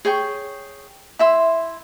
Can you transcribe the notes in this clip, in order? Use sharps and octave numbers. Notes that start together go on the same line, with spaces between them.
G#4 C#5 G5 C#6
E4 E5 C6